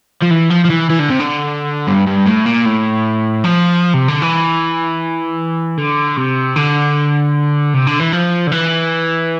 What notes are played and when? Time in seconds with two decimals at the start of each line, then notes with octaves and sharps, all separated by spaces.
0.22 F3
0.31 E3
0.51 F3
0.65 F3
0.70 E3
0.90 E3
1.00 D3
1.10 C3
1.20 D3
1.88 G2
2.07 G2
2.26 A2
2.46 A#2
2.66 A2
3.44 F3
3.94 C3
4.08 D3
4.22 E3
5.78 D3
6.17 C3
6.56 D3
7.74 C3
7.87 D3
8.00 E3
8.13 F3
8.47 D3
8.52 E3